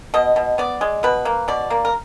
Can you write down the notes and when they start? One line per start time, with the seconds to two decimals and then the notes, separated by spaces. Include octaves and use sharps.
0.14 B2 D#5
0.36 B2
0.58 B3 D5
0.81 G#3
1.03 B2 B4
1.25 A#3
1.48 B2 D5
1.70 A#3
1.85 A#4